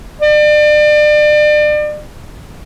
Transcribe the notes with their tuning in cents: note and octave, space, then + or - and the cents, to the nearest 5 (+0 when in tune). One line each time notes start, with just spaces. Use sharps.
D5 +35